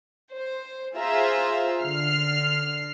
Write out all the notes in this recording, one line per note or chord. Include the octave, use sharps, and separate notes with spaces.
C5
F4 G#4 C5 E5 A#5
D3 F6 C7